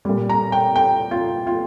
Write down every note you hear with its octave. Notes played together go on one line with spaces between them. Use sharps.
A#2 G3
A#5
G5
G5
F4
F4